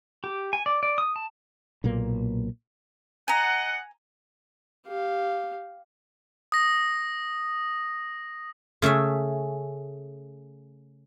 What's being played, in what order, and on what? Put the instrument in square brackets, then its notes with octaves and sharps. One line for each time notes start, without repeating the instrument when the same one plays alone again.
[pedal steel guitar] G4
G#5
D5
D5
D#6
A5
[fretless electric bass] B1 A#2 A#3
[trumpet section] D#5 F#5 [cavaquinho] G#5 A#5
[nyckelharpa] G4 F5
[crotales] D#6 A#6
[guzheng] C#3 A3 G#4 E5